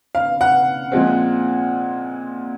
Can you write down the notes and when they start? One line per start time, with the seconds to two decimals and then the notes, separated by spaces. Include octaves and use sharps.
0.15 F5
0.41 F#5
0.92 A#2 F3 G#3 C4